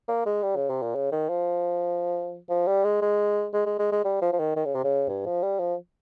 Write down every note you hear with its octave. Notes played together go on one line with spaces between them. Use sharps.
A#3
G#3
G3
C#3
C3
A#2
C#3
D#3
F3
F3
G3
G#3
G#3
G#3
G#3
G#3
G#3
G3
F3
F3
D#3
D#3
C#3
C3
C#3
G2
F3
G3
F3